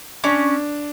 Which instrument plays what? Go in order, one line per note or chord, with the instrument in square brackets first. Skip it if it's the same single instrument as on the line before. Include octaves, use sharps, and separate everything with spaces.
[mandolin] C#4 [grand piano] D4